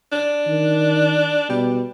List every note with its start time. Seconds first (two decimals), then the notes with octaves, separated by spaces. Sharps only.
0.12 D4
0.47 D#3
1.49 B2 G3